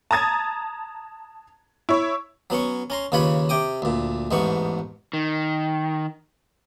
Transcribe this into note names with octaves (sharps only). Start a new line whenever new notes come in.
A5 A#5 D#6 G#6 A6
E4 C#5
F#3 B3 C#4 C#6
C#4 A#5 C6
D#2 C#3 F4 B4 C#5 B5
C3 G5 D6 D#6
D2 A#2
A1 E2 G#2 B3 C#6
D#3